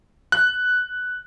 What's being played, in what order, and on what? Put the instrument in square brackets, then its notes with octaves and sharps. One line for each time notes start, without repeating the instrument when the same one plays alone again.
[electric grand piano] F#6